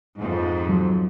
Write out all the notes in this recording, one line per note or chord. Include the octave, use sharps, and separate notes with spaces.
F2 G#2
F#3